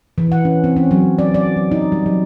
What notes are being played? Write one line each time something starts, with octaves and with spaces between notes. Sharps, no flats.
E3
F#5
C#4
C4
C#4
F#3
D5
D5
F#3
D#4
G3
F#3